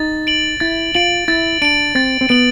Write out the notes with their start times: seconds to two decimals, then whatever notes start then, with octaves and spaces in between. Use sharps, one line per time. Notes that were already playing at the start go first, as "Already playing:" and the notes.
Already playing: D#4 A6
0.27 D7 F#7
0.60 E4 A6
0.95 F4 D7 F#7
1.28 E4 A6
1.62 D4 D7 F#7
1.95 C4 A6
2.21 C4
2.29 B3 D7 F#7